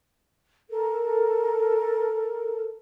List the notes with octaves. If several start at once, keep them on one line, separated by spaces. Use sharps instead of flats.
A4 A#4